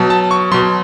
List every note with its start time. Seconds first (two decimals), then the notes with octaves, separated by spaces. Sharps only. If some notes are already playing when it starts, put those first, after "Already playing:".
Already playing: B2 F#3 A5
0.10 A5
0.31 C#6
0.52 B2 F#3 C6